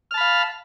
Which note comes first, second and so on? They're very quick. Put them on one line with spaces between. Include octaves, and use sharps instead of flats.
F6 A5 B5 F5